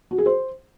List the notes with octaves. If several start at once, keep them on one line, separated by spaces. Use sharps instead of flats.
F#4
G#4
C5